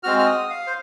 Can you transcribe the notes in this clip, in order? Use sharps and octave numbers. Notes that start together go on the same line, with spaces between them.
G#3 C4 F#4 F6
F6
D#6
F5
C5